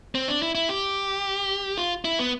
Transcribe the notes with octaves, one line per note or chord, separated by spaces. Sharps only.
C4
D4
E4
E4
G4
F4
E4
B3